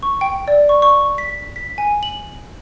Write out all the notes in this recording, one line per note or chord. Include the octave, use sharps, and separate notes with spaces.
C#6
G5
D5
C#6
C#6
B6
B6
G#5
F#7